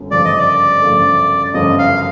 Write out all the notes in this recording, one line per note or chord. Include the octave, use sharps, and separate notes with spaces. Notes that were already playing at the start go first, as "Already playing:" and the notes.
Already playing: G1 F#2 A3
G1 F#2 C#3 F3 A3 D5
D#5
D5
G1 F#2 C#3 F3 A3
G1 F#2 C#3 F3 A3 D#5
F5